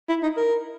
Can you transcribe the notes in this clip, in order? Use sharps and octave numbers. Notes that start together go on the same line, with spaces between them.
E4
D#4
A#4